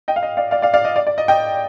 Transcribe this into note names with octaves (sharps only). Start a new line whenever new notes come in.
D#5 G5
F5
D#5
D5 F5
D5 F5
D5 F5
D5 F5
D#5
D5
D5
D#5
D#5 G5